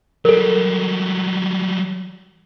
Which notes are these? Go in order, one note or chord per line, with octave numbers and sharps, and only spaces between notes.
F#3 G3 A4 A#4